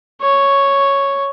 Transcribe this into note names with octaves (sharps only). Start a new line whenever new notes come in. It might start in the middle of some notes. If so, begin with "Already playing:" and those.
C#5